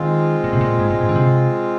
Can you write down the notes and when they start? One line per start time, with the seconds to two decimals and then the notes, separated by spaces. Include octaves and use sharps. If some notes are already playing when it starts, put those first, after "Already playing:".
Already playing: D#3 G#3 C4 F4
0.44 A#2
0.53 C3
0.61 A#2
0.80 G#2
0.91 A#2
1.01 G#2
1.09 D3
1.16 C3